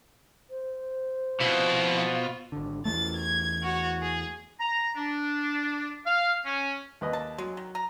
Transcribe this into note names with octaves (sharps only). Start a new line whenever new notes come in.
C5
F2 B2 E4 F4
G#1 D3
E2 E3 A3 A6
G#6
F#4 C#5
G#4
A#5
D4
F5
C#4
D#2 B4 D#5
A5
F#3 G#3
D#3
A#5